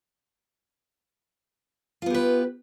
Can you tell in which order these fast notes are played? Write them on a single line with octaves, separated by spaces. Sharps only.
F4 B3 G4 B4